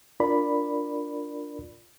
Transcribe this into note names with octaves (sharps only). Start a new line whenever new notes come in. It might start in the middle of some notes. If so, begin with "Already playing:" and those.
D4 F4 A#4 D5 B5